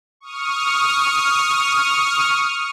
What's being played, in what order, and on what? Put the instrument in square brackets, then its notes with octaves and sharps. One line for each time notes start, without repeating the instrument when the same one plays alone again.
[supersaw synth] C#6 D#6 F6